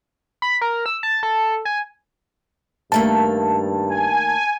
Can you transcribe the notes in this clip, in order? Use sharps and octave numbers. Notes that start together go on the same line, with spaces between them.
B5
A#4
E6
A5
A4
G#5
G2 D#3 A3 A#3 A5
G#5